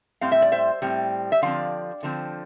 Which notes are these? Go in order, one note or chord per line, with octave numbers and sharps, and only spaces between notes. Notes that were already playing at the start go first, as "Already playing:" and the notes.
A2 G3 C4 F5
E5
D5
C5 E5
A2 G3 C4
E5
D3 F3 C4 D5 F5
D3 F3 C4